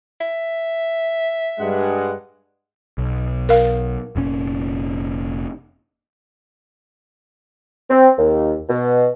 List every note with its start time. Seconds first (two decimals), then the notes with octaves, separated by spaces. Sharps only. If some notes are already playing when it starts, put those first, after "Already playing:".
0.21 E5
1.59 G2 G#3 F#5
2.98 B1
3.49 A#4 F5
4.16 F1 A#2 C#4
7.90 C4
8.17 D#2
8.70 B2